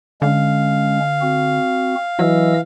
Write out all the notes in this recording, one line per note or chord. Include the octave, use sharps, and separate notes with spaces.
D3 G#3 C#4 F5
C4 F#4
E3 F#3 D#5 E6